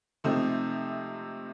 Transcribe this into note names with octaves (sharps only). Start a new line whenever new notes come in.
C3 F3 A3 C4 D#4